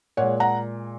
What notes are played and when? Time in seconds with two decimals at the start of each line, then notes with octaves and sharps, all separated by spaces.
0.17 A#2 G#3 C#5 F#5
0.40 F#5 A#5